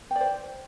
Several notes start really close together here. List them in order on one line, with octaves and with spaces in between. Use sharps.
G5 D5 C5